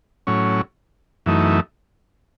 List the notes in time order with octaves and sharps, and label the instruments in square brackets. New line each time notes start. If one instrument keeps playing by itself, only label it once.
[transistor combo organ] A2 F#3 C#4
F#2 E3 A3 D#4